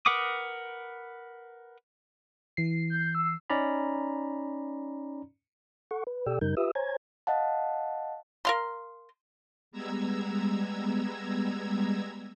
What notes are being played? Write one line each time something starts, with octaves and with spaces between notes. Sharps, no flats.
A#4 B4 F#5 D6 D#6
E3 C7
G6
E6
C#4 D#4 D5 A#5 B5
A4 F#5 C#6
B4
B2 G4 A4 D5 G5 E6
F#2 C#3 G3 D#4 A#4 G6
F4 G4 B4 E5 D#6 E6
C5 C#5 G#5 A#5 G#6
D#5 F5 F#5 A5
A#4 F5 C6
G3 G#3 B3 A#5 E6 G#6